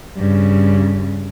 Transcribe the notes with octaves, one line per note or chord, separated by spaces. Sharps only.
G2 C#3